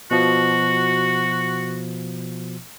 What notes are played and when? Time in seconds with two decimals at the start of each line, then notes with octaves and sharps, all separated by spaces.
0.11 B2 F3 F#4